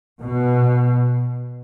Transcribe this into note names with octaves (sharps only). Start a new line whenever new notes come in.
B2